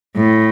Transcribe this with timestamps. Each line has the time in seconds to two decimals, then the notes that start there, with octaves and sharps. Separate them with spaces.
0.16 A2